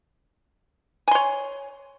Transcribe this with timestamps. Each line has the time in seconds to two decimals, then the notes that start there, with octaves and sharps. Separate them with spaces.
1.08 G#5
1.11 C6
1.15 C#5